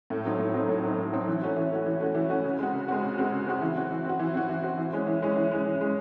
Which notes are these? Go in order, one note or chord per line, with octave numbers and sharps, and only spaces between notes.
A2
F#3 C4 D#4
A2
F#3 C4 D#4
A2
F#3 C4 D#4
A2
F#3 C4 D#4
E3
A3 C#4 F#4
E3
A3 C#4 F#4
E3
A3 C#4 F#4
E3
A3 C#4 F#4
C#3
G#3 C4 F#4
C#3
G#3 C4 F#4
C#3
G#3 C4 F#4
C#3
G#3 C4 F#4
E3
C4 F#4
E3
C4 F#4
E3
C4 F#4
E3
C4 F#4
E3
G#3 C#4
E3
G#3 C#4
E3
G#3 C#4
E3
G#3 C#4